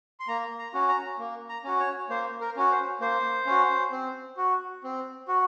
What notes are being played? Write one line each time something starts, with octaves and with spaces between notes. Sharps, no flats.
C6
A#3 A#5
A#5
C#4 F#4
A#5
A#3
A#5
C#4 F#4
C#5
A#3 C5
A#4
C#4 F#4
C5
A#3 C5
C#4 F#4
C4
F#4
C4
F#4